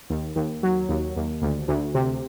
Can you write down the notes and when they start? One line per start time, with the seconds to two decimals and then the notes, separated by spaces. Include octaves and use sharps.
0.10 D#2
0.36 D#2
0.63 F#3
0.89 D#2
1.16 D#2
1.42 D2
1.68 D2
1.95 C3